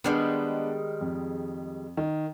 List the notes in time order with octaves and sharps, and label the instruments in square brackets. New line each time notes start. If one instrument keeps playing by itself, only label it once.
[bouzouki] D#3 G3 G#3 [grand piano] B3 D4
[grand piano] F2
D#3